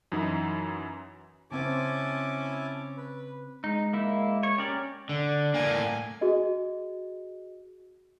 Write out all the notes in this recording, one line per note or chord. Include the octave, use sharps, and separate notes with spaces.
F#2 E3 D#4 E4
C#3 C4 C#4 E4 C5 G#5 A5 D6
B4
G#3 D#4
A#3 E4
C#5
C#4 G4 A#4 D5
D3 D5
A2 A#3 G#5
F#4 G#4 D#5